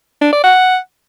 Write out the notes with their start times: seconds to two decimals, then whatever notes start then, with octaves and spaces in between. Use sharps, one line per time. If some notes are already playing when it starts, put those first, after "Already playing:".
0.21 D4
0.32 D5
0.44 F#5